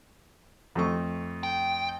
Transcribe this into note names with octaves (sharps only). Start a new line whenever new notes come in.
F2 A3 C#6
G5